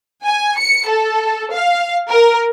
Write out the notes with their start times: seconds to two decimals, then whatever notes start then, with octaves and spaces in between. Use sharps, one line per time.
0.24 G#5
0.57 C#7
0.87 A4
1.53 F5
2.10 A#4